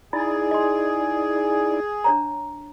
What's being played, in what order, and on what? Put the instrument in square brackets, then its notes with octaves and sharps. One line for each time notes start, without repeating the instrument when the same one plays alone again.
[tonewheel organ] D#4 E4 D5 [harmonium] G#4
[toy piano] D#5 C6
D4 C#5 A#5